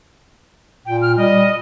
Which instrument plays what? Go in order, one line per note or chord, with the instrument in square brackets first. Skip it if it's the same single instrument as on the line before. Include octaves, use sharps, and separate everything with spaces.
[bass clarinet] A#2 [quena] G5
[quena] F6
[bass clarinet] G3 [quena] D#5